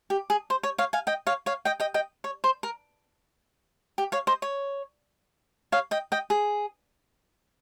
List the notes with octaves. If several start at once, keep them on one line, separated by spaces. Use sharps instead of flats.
G4
G#4
C5
C#5
C#5 F5
F5 G#5
D#5 G5
C#5 F5
C#5 F5
D#5 G5
D#5 G5
D#5 G5
C#5
C5
A#4
G4
C#5 F5
C5 D#5
C#5
C#5 F5
D#5 G5
D#5 G5
G#4